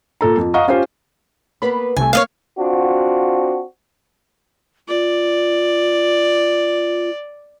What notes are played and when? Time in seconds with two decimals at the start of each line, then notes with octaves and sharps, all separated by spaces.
0.21 A#2 A4 A#5
0.37 F2
0.54 D#5 F5 F#5 A#5 C#6 D#6
0.68 C#4 F4 G4 C5
1.62 A#3 B3 B4 B5
1.97 C2 C3 A3 G#5
2.13 A#3 C#5 D#5 F5
2.58 C4 D4 F4 F#4
4.88 F4 D5